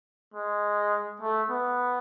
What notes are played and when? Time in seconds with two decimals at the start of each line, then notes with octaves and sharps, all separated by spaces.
0.34 G#3
1.21 A3
1.50 B3